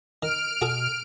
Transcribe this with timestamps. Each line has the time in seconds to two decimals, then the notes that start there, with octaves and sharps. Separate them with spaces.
0.23 D#3 F6 D7
0.61 B2 F#4 G#4 A4